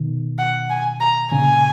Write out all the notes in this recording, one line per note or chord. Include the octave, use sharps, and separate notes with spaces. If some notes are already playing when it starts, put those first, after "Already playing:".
Already playing: B2 D#3
F#5
G#5
A#5
A#2 C#3 G#5